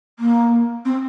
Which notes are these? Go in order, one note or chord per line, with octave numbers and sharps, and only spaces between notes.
A#3
C4